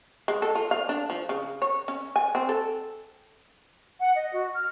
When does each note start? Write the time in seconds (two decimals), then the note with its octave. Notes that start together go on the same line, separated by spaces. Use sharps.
0.28 G#3
0.42 A4
0.55 F4
0.71 F5
0.89 D4
1.10 F3
1.29 C#3
1.62 C#5
1.88 C#4
2.16 G#5
2.35 C4
2.49 A4
4.01 F#5
4.15 D#5
4.32 F#4
4.53 F6